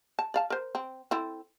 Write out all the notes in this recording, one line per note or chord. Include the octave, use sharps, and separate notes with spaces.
A5
D5 F5 A5
A#4 C5
C4
C4 E4 A4